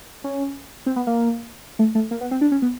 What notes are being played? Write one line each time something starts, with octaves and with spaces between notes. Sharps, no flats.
C#4
C4
B3
A#3
A3
A3
A#3
B3
C4
D4
C#4
B3